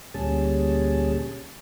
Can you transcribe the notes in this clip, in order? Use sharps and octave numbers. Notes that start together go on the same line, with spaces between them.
D2 A#2 G3 C#4 G#4 A5